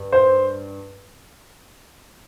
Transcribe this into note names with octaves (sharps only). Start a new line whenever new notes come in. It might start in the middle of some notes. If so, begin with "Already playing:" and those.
Already playing: G2
C5